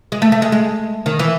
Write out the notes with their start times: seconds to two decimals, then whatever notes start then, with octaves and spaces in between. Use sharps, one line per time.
0.12 G#3
0.22 A3
0.32 A3
0.42 G#3
0.52 G#3
1.06 D#3
1.19 E3